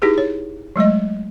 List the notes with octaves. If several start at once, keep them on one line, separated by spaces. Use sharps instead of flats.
D#4 E4 G4 G#4 B4
C#5
F#3 G#3 A3 D#5